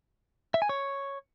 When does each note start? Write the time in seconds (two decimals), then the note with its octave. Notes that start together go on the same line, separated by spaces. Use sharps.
0.54 E5
0.62 G#5
0.69 C#5